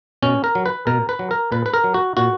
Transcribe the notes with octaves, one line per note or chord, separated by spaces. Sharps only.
B2 C#4
A#4
F#3
B4
B2 A#4
B4
F#3
A#4
A#2 B4
B4
A#4
F#3
F#4
A#2 F#4